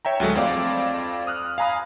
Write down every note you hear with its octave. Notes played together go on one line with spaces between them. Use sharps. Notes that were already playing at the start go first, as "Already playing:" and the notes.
C#5 E5 G5 A#5
D2 F#3 G#3 A3
F2 C4 D5 F5 D6
D#6 F6 F#6
F5 G#5 A#5 B5 D#6